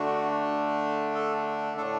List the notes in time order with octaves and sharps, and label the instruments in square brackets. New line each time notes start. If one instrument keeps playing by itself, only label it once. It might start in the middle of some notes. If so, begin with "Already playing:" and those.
Already playing: [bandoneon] D3 A3 D4 F#4
A4
A2 A3 D4 A4